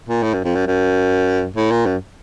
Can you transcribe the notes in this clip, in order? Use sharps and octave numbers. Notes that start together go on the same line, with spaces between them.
A#2
A2
F#2
F2
F#2
F#2
A2
A#2
F#2